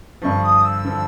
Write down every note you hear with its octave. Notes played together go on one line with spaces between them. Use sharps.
G2 D3 F3 C#6
D#6
E6
D3 F3